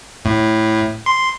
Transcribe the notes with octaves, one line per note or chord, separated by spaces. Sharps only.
A2
C6